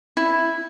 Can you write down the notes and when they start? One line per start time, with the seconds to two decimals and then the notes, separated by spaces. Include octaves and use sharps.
0.17 E4